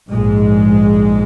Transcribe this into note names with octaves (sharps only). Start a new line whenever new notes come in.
A#1 G#2 G#3